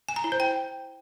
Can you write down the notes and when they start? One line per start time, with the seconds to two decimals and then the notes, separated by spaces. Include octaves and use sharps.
0.08 G#5
0.16 A#5
0.24 E4
0.32 C5
0.40 G5